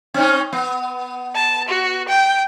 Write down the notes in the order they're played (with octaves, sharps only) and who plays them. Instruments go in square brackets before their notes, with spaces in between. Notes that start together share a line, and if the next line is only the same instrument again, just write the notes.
[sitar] C4 C#4 D#4
B3
[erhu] A5
F#4
G5